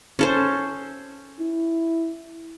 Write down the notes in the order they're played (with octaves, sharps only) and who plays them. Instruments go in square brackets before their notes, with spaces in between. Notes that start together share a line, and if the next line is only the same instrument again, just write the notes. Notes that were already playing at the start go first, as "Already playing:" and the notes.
[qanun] C#4 A4 C5
[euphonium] E4